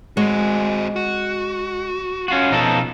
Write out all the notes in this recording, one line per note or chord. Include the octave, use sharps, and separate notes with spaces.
G#3 C4 F#4
F#4
C#4 F4 F#4
B2 F3 D#4 A4